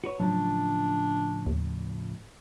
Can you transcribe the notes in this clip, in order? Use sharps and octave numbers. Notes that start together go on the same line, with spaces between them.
F#4 B4 C#5
A2 C#3 F3 F#3 D4
D#2